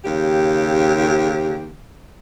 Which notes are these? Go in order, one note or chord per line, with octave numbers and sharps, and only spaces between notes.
D#2 C#3 G4